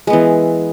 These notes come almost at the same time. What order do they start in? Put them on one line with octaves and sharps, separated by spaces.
G#3 B3 E3